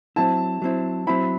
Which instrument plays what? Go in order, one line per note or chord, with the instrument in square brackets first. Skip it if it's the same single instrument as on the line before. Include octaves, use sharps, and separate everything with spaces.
[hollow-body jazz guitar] F#3 C4 E4 [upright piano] A5
[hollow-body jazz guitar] F#3 C4 E4
[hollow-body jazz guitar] F#3 C4 E4 [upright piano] B5